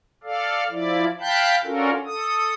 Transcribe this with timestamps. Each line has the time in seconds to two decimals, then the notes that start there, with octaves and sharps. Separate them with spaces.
0.23 A4 D5 F5
0.70 F3 E4 D5
1.20 F5 G5 A5 B5 F#6 G6
1.64 C#4 D4 F4 F#4 A4 A#4
2.06 A4 D#6